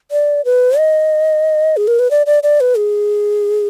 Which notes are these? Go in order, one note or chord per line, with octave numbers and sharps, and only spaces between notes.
D5
B4
D#5
G#4
A#4
B4
D5
D5
D5
B4
G#4